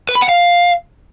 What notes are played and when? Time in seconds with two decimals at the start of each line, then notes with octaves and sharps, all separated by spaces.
0.09 B4
0.15 B5
0.22 F#5
0.29 F5